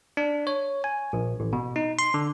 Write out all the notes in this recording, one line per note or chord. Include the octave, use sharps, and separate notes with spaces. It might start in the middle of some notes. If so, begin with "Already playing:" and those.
D4
C#5
G#5
A#1
A1
B2
D#4
C6
D3